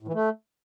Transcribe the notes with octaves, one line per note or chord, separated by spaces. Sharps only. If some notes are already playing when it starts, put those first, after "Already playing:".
A2
E3
A3